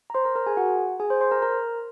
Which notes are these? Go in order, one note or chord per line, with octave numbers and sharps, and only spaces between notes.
A#5
C5 C6
A#4 A#5
A#4 A#5
G#4 G#5
F#4 F#5
G#4 G#5
C5 C6
C5 C6
A#4 A#5
A#4 A#5